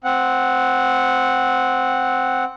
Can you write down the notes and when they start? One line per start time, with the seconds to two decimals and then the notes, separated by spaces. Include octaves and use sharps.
0.04 C4 F#5